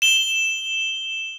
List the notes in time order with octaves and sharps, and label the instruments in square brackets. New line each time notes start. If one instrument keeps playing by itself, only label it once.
[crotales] E7 G7